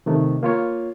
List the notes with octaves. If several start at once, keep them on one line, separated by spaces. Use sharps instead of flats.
C3 D#3 A3
A#3 F4 C#5